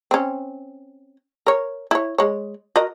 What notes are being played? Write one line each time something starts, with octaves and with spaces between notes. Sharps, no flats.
C4 C#4
A#4 C#5
E4 C#5
G#3 C#5
F#4 A#4 D#5